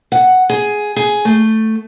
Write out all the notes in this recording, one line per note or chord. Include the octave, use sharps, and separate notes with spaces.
F#5
G#4
G#4
A3